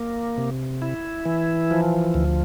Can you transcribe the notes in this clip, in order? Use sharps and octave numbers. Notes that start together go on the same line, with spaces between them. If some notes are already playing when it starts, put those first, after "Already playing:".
Already playing: A#3
C3
E4
E3
F3
D2